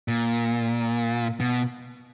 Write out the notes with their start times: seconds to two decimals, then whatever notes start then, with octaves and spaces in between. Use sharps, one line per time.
0.08 A#2
1.40 B2